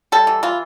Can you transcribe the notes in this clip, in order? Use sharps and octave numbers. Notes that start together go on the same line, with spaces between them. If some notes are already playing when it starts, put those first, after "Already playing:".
G3 A4
E3
E3 F4